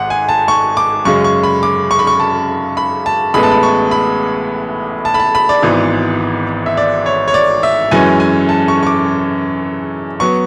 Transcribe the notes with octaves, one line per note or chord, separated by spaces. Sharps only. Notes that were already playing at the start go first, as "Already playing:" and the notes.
Already playing: G#1 G#2 F#5
G#5
A5
C#6
D6
F#2 C#3 G#3 C#4 C#6
C#6
B5
D6
C#6
B5
C#6
A5
B5
A5
A1 A2 G#3 B3 B5
A5
B5
C#6
B5
A5
B5
A5
B5
D5
G#1 G#2 E3 B3
E5
D5
C#5
C#5
D5
E5
F#2 E3 G#3 C#4 G#5
G#5
A5
C#6
C#6
D6
F#3 B3 C#6